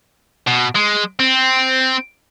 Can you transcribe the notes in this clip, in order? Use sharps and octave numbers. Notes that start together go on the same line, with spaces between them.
B2
G#3
C4